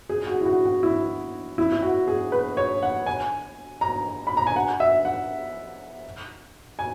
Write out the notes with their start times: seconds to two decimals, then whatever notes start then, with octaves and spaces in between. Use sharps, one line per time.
0.09 G#4
0.27 F#4
0.41 E4
0.46 F#4
0.66 F#4
0.83 E4
1.58 E4
1.72 E4
1.82 F#4
2.08 G#4
2.32 B4
2.57 C#5
2.83 F#5
3.06 G#5
3.81 A#5
4.27 B5
4.37 A#5
4.47 G#5
4.56 F#5
4.80 E5
5.05 F#5
6.79 G#5